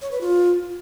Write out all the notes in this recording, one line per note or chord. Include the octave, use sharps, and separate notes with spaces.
C#5
B4
F4